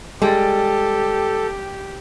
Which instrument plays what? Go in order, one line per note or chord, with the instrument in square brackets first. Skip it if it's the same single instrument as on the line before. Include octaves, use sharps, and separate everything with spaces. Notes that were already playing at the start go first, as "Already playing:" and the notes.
[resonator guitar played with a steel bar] G3 [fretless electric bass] G#3 [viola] G4 [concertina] A4